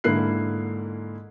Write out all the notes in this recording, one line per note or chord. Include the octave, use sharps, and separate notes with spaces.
G#2 D3 A#3 E4 F#6 C7